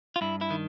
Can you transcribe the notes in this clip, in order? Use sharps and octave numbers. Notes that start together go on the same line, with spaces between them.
F4
G2 E4
E4
D#3